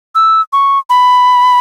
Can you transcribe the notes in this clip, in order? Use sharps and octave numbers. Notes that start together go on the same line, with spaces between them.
E6
C#6
B5